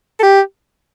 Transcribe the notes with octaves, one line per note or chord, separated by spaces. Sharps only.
A4
G4